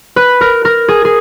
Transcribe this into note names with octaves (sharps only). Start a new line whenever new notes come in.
B4
A#4
A#4
G#4
G#4